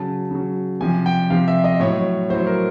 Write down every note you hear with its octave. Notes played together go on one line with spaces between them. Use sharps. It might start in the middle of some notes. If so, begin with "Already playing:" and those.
Already playing: C#3 F#3 A5
C#3 F#3
C3 F3 G#5
G5
C3 F3 F5
E5
D#5
A2 F#3 C#5
A2 F#3 C5
A#4